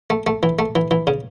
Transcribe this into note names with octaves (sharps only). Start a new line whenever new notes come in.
A3
A3
E3
A3
E3
E3
C#3